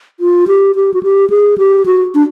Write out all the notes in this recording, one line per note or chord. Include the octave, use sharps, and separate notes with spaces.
F4
G4
G4
F#4
G4
G#4
G4
F#4
D4